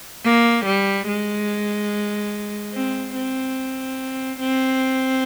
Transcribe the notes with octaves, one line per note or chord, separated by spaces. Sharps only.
A#3
G3
G#3
C4
C4
C4